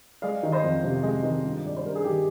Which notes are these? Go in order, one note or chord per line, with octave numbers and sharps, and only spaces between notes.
G#3 D5 F5
D#3
C5 D#5
F2
C3
G#3
D#3
G2 F4
G#3 D5
C5
G2 A#4
G#4
D#3 G4